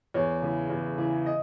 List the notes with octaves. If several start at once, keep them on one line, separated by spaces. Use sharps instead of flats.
E2 C#5
C#3 E3
E2
C#3 E3
D#5